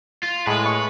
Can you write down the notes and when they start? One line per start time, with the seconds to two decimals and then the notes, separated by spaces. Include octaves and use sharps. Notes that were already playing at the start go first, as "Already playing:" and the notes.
0.23 F4
0.47 A2 G#3 B4
0.65 C#6